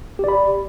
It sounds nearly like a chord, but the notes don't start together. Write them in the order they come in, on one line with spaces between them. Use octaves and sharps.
G4 D5 B5